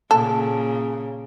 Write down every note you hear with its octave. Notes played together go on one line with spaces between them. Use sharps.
A#2 C#3 A4